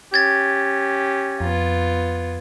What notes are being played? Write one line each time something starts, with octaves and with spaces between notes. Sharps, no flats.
C#4 G4 G#6 A6
F2 B3 F4